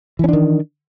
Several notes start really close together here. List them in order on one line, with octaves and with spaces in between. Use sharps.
E3 C#4 D4 D#3